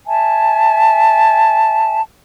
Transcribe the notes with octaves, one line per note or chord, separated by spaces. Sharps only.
E5 G#5 A5